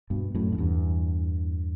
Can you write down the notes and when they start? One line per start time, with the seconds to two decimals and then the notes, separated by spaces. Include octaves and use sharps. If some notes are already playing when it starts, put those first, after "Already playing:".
0.10 G2 B2
0.35 F#2 A2
0.52 F#2
0.58 E2 G2